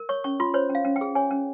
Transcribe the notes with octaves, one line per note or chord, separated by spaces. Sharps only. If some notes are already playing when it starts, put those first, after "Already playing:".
Already playing: A#4
C#5 C#6
C#4 C#6
F4 C6
C5 C#5
C#4
F5
C#4
G5
G#4
C#5 G#5
C#4